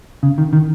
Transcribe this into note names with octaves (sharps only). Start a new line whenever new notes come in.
C#3
D#3
D#3